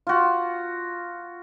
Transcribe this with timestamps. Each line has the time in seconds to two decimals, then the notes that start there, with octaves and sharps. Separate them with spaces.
0.07 F4 F#4